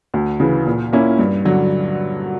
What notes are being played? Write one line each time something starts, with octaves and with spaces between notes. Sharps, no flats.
D2
C#3 E3
A#2
A#3 C#4 E4
G2
D3 F#3